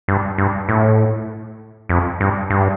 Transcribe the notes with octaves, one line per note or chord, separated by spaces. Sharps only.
G2
G2
A2
F2
G2
G2